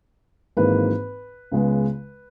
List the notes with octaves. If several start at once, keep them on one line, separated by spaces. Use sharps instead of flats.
G#1 G#2 E3 A#3 B4
C#2 C#3 G#3 B3